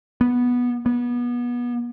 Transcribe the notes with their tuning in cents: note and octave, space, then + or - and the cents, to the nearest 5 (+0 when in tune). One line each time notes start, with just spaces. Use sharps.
B3 -10
B3 -30